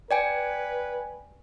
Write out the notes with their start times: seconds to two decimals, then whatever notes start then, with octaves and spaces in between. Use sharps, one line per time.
0.11 B4 D5 G5 G#5